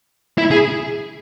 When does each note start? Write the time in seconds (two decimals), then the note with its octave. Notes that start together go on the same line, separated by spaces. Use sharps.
0.38 E4
0.51 G#4